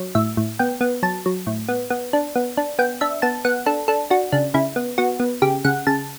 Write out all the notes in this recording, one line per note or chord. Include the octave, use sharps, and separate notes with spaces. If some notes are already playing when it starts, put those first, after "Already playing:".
Already playing: F#3
A2 E5
A2
B3 G5
B3
F#3 A5
F#3
A2
B3
B3
D4
B3
D4
B3 G5
D4 E5
B3 A5
B3 F#5
D4 A4
D4 A4
D4 F#4
C#3 D4
C#3 E4
B3
B3 F#4
B3
C#3 G4
C#3 F#5
C#3 A5